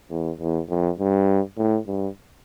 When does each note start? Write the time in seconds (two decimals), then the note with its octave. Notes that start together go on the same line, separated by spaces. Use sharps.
0.10 E2
0.40 E2
0.69 F2
0.99 G2
1.58 A2
1.87 G2